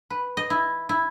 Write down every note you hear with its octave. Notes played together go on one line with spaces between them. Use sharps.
B4
D#5
E4
E4